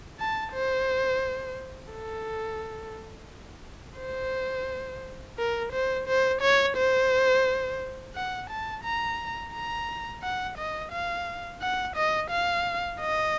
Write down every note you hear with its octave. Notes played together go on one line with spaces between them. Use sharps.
A5
C5
A4
C5
A#4
C5
C5
C#5
C5
F#5
A5
A#5
A#5
F#5
D#5
F5
F#5
D#5
F5
D#5